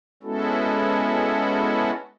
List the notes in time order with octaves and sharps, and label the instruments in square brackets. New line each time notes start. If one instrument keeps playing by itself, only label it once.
[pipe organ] G#3 B3 C#4 E4 F#4 A4